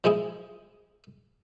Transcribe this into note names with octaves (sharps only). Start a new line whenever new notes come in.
F3 G#3 E4 G#4